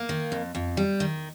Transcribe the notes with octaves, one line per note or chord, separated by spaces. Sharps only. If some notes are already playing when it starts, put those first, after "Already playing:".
Already playing: A#3
D#3
F2
F2
G3
D#3